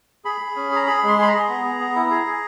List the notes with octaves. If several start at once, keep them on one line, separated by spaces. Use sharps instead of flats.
G#4 B5
G#4
C#4
G#4 A#5
G#4 B5
G#3 C6
G#4 B5
A#5
G#4
B3
G#4
B3
E4
G#4
G#4